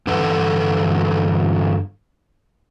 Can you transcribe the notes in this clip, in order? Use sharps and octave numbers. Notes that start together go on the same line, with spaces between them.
G2 D3 E3 A4 B4 F#5